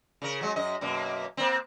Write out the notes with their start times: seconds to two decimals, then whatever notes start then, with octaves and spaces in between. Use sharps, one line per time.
0.22 C#3 A#4
0.41 F#3 G#3
0.56 F#2 D#5
0.81 F#2 B2 A#3
1.37 A#3 C4